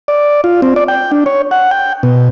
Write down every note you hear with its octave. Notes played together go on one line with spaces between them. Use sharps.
D5
F4
C4
D5
G5
D4
C#5
F#5
G5
B2